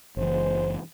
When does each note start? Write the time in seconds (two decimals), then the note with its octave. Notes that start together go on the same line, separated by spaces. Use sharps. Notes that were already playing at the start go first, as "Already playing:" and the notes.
0.17 F#1 C#2 E3 G#3 C5